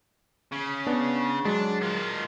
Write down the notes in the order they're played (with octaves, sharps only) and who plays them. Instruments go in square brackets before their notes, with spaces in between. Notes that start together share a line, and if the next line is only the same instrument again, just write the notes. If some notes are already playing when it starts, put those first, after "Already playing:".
[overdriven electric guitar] C#3
[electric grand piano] B3 D4
[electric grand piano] F#3 G#3 [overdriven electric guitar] D4
[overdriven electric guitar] D#3 F4